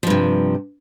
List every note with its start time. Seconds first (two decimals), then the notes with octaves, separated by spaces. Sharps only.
0.03 F3
0.07 G2
0.10 C3